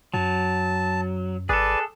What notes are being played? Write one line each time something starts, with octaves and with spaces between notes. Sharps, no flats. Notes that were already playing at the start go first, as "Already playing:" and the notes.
F#2 F#3 A5
G#1 G#4 A4 B4 D5